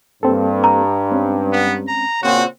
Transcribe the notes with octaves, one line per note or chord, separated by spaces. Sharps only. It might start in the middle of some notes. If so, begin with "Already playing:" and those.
G2 A#3 C4 A4
A#5
G#3 C4 C#4
B3
A#5
A#2 C#3 C4 F#4